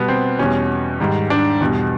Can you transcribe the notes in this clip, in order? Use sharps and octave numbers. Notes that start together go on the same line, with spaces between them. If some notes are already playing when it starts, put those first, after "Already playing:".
Already playing: B2 G3 B3
C4
E2 B2 G3 C#4
G#2 D#3 G3
D4
E2 B2 G3